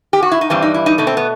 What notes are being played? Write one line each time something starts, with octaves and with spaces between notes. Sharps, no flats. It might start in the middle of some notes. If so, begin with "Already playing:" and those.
G4
F#4
E4
D#4
G2 E3 G3 C4
D#4
E4
D#4
B2 A3 D#4
C4
B3